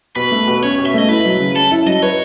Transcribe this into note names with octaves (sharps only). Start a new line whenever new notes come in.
B2 B4
A3
B2
C#4 C#5
B2
E5
A3 D#5
E4 B4
F#3
C#3
C#4 A4
E4
F#3 D#5
B4 C#5